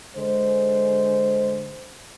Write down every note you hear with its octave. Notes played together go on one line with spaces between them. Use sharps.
D3 G#3 C5